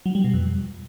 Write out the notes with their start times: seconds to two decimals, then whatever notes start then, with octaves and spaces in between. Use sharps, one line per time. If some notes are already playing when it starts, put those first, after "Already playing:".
0.06 F#3
0.15 G3
0.24 B2
0.34 F2